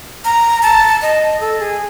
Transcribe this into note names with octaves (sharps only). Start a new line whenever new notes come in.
A#5
A5
D#5
A4
G#4